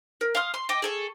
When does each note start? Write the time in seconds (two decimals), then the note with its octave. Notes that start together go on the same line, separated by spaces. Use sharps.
0.21 A#4
0.35 F5 C6 D#6 F6
0.54 C6
0.69 D#5 G5 D6
0.82 G#4 A4 C#6